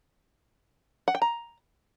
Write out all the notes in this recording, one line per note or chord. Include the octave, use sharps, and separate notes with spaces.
F#5
G5
A#5